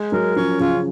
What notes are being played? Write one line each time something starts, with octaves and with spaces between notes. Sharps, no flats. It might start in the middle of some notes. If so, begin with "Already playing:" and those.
Already playing: G#3
F#3 A#4
F3 C#4
C#3 F4